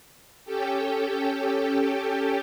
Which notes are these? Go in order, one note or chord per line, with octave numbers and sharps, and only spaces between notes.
C#4 G4 A4 G5